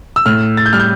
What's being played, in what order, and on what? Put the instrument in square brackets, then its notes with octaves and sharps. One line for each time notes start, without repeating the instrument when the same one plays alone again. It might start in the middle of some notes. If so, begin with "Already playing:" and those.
[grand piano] E6
A2 F6
A6
G6
G3 F6
G6